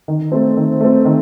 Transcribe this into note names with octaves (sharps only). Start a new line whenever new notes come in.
D#3
A3 C4
D#3
A3 C4
D#3